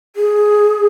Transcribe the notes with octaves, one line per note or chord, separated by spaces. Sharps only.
G#4